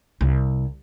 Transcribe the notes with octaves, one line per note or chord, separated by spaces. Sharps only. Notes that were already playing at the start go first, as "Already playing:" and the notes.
C2